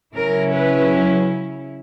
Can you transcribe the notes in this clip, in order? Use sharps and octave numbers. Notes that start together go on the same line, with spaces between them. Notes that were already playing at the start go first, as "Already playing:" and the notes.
C#3 F#3 C#4 E4 A#4
B4